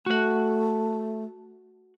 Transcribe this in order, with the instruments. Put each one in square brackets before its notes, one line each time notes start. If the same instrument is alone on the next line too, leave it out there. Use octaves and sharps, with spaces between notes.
[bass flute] A3 [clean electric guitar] F#4 F#5